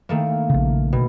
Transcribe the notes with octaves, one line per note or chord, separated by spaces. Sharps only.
D#3 A3 A#3
A#1 C#3
B2